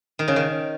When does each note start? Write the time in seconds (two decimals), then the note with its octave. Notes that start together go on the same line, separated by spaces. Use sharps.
0.19 D#3
0.28 C#3
0.36 D#3